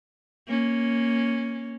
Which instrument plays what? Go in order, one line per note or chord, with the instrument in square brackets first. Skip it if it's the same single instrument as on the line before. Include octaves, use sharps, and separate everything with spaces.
[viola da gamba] A#3 C#4